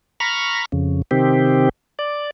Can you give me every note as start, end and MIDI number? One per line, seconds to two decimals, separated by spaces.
0.20 0.65 82
0.20 0.65 83
0.20 0.65 85
0.20 0.65 89
0.72 1.02 41
0.72 1.02 49
1.11 1.69 48
1.11 1.69 51
1.11 1.69 60
1.11 1.69 67
1.99 2.31 74